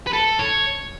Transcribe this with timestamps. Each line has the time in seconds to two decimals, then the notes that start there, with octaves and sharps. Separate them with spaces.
0.07 B4
0.13 A4
0.39 C#5